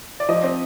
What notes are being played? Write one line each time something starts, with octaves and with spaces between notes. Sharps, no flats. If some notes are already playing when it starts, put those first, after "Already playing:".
D5
F3 D#5
C4